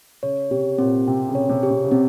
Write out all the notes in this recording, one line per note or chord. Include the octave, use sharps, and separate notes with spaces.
C#3 C#5
C3 G4
A#2 C4
C3 G5
C#3
C#5
C3
G4
C3
C#3
C3 C4